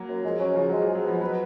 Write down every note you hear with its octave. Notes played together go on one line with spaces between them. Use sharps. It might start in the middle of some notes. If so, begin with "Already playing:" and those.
Already playing: F#3 A#3
F#2
F3 G#3
F#3 C#4
C#3 F3
F#3 G#3
F3
G#3
F#3
F3 B3
F#3 B4